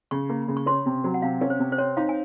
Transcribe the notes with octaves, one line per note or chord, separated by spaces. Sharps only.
C#3 C#6
A#3
C#3
C#6
C#4 C6
C3
F#3
F#5
C3 F5
C#4
C5
C3
C5
C4 C#5
D#4 F5
G#5